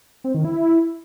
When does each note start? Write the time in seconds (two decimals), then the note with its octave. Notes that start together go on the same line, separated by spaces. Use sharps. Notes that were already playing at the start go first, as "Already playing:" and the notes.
0.24 C4
0.34 D#3
0.45 E4